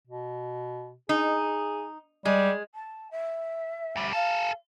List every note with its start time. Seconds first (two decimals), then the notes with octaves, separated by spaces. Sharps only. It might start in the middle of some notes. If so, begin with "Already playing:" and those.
0.07 B2
1.09 D#4 G#4
2.25 G3 G#3
2.74 A5
3.10 E5
3.96 D2 G3
4.12 G#4 A4 F5